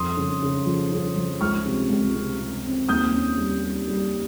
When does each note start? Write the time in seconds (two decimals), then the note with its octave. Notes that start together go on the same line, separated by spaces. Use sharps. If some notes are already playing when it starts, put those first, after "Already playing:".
Already playing: F2 C6 D#6
0.17 C#3
0.42 C#3
0.66 F3
0.92 C#3
1.16 F3
1.41 C#2 C#6 F6
1.66 C3
1.90 C#2
2.15 C3
2.39 C3
2.64 C4
2.89 D#2 D#6 G6
3.13 C#4
3.38 G3
3.64 G3
3.88 G3